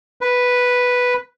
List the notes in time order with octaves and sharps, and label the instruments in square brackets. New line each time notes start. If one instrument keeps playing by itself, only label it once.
[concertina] B4